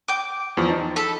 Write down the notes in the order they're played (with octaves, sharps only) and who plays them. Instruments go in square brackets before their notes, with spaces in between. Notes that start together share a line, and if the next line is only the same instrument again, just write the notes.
[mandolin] G5 D6
[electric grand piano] E2 F3 C#6
D#4 A5
[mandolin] A4 B5